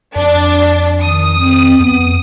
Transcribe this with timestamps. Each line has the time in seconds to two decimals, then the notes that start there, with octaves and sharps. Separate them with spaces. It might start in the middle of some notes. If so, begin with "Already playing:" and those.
0.16 F2 D4
1.03 D#3 D#6
1.38 C4
1.80 F2 B3 D#6